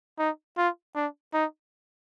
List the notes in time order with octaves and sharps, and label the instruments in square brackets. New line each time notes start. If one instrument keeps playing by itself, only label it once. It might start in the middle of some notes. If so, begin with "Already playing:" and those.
[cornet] D#4
F4
D4
D#4